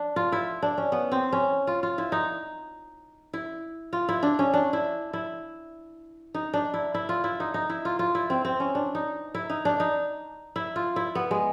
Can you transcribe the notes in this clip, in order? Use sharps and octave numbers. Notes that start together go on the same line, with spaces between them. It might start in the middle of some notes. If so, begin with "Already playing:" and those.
Already playing: D4
F4
E4
D4
C#4
B3
C4
C#4
F4
F4
E4
D#4
E4
F4
E4
D4
C#4
D4
E4
E4
D#4
D4
E4
E4
F4
E4
D#4
D#4
E4
F4
F4
E4
C4
C4
C#4
D4
D#4
E4
D#4
D4
D#4
E4
F4
E4
B3
G#3